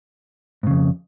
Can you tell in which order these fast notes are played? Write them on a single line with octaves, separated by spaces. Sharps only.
G#2 C#3 F2